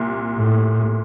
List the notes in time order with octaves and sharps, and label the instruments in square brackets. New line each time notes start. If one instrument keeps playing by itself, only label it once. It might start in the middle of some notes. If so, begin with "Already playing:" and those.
Already playing: [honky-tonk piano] C2 A#2
[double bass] A2